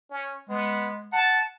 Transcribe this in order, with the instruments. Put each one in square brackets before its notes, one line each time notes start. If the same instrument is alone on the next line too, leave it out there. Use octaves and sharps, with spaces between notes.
[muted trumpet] C#4
[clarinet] G#3 [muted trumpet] B3
[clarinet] F#5 [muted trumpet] A5